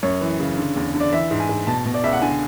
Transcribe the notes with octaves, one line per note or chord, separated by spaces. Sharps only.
F#2 C#5
E3
C#3
D3
E2
D3
D5
E3 E5
G#2
G#5
G#2
B2 A5
B2
D5
C#2 E5
F#5
D3 G#5